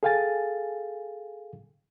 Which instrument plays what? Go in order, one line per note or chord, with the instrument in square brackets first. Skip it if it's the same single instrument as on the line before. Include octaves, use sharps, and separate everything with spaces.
[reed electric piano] G#4 A4 F5 G5 G#5 A6